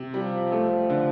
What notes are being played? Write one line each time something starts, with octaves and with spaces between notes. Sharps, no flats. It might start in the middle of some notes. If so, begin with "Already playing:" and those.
Already playing: C3
F3 G3
A3
D3